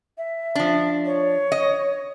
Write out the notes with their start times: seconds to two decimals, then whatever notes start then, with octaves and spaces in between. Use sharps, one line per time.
0.18 E5
0.55 F3 D4
1.06 C#5
1.52 D#5